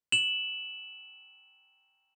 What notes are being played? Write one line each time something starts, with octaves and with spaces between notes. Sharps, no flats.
E7 F#7